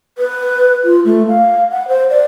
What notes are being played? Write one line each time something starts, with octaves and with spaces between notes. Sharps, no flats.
B4
F4
A3
F5
F#5
C5
D5